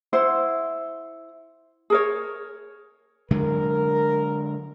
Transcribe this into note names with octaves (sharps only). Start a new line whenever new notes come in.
E4 C5 F#5
G#4 A#4 C#5
D3 F#3 G#3 A#4